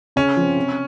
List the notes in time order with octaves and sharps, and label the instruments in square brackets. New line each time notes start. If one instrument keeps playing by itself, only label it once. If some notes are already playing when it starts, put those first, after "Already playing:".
[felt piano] C#3 [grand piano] C#4
[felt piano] F3 C4
C3